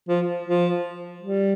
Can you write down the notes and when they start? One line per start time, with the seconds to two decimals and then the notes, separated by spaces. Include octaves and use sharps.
0.08 F3
0.46 F3
1.21 G3